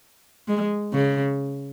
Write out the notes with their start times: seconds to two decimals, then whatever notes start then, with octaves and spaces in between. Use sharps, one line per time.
0.48 G#3
0.93 C#3